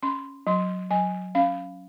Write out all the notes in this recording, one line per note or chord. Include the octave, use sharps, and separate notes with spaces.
C#4 C6
F#3 C6
F#3 G#5
C#4 F5